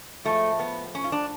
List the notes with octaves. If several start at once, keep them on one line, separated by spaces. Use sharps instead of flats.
A2 F3 G#3 A3
B3
C#4
F4
D4